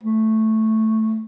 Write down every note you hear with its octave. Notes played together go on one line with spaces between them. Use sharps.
A3